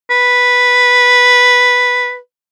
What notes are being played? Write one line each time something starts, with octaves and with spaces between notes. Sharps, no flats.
B4